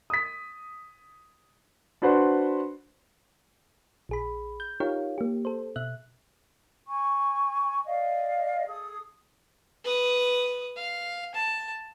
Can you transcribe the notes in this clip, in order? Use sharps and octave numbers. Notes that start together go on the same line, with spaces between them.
D#6 B6
D4 F#4 B4 C5 F#5 C6
A#1 G#4 B5
G6
D#4 F4 G4 A#4 C#5 F5
A#3 G4
A4 C5
B2 E5 F#6
G#5 C#6
D5 D#5 F5
G#4 A4 D#6
B4 D#6
F5
A5